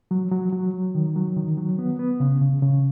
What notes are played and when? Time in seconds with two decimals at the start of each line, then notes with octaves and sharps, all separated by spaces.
0.11 F#3
0.32 F#3
0.53 F#3
0.74 F#3
0.95 D#3
1.16 F#3
1.37 D#3
1.57 F#3
1.79 B3
1.99 B3
2.20 C#3
2.41 C#3
2.62 C#3